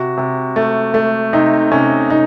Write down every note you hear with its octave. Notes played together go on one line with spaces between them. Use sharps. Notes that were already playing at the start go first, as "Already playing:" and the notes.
Already playing: C3 F#4
C3
A3
A3
C3 D#4
C3 C#4
C3 D#4